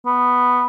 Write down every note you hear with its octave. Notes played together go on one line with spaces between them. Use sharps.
B3